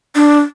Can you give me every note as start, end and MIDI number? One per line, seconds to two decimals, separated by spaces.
0.16 0.40 62